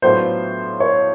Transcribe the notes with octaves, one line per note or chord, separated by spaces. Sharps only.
A2 F#3 B3 D4 F4 C5
C#5